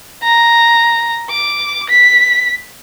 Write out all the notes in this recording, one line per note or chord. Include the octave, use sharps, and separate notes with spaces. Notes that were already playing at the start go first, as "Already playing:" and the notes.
A#5
D6
B6